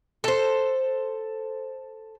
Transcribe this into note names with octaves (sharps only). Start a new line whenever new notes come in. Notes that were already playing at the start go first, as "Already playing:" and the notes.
A4 C5